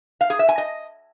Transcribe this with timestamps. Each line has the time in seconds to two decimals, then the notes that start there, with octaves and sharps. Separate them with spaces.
0.21 F5
0.30 G#4
0.39 E5
0.49 G#5
0.58 D#5